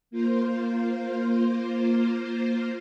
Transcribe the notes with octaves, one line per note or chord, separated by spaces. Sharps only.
A#3 F4 C5